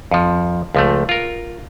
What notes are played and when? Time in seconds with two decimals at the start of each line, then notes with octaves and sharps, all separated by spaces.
0.11 F2 F3
0.75 C#2 F3 A3
1.09 F4 A#4